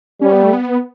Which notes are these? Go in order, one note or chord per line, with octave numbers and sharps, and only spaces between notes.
G3 C#4
B3
A3
B3